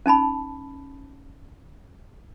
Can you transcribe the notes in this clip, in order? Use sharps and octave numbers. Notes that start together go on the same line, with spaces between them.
C#4 D#4 A5 B5